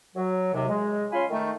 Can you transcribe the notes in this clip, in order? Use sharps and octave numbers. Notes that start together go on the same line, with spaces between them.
F#3
D#2 C3
G#3
C#4 F4 F5 G#5 B5 C6
D#3 A3 D#4